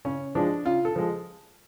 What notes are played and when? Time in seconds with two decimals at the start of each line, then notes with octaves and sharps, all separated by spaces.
0.05 C#3 C#4
0.35 F3 G#3 D4
0.65 C#3 F4
0.85 A4
0.96 F3 G#3